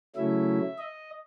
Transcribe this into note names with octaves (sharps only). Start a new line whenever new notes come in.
C#3 F#3 A3 C#4 E4 E5
D#5